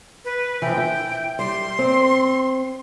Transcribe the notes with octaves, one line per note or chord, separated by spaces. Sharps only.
B4
E3 F3 G5
E4
G3 C6
C4